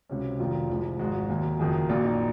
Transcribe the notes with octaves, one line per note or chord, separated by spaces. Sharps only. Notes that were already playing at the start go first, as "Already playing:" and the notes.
C#2 C3 F#3 C#4
F1 F2 D#3 F#3 F4
C2 C3 F3 G#3
G#1 G#2 F3 G#3 F#4
D#2 D#3 F#3
F#1 F2 D#3 F#3 G#4
A#1 A#2 F#3 F4
D#4